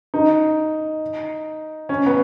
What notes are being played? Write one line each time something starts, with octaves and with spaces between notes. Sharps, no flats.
D#4
C#4
B3